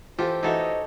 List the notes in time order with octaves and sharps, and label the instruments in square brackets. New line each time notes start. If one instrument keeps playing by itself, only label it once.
[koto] E3 G4 A4 [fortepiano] F4 [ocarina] C5
[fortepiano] E3 F#4 E5 [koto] D#4 A4 C#5 [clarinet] D#5